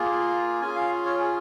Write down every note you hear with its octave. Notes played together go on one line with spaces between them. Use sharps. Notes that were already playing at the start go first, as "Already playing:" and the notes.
Already playing: A#3 F4 G#4
C#4 F4 G#4 G#5
F5
C#5
G#4